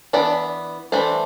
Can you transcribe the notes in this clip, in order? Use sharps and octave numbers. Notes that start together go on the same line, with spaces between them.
E3 B3 D4 D5
E3 A3 D4 C5